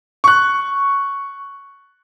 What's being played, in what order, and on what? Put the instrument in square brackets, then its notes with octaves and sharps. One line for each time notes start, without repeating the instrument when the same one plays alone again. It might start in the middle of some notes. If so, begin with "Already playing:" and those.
[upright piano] C#6 F#6